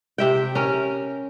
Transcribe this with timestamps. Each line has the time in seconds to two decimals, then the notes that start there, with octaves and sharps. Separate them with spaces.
0.18 C3 E5 G5
0.55 C#4 A#4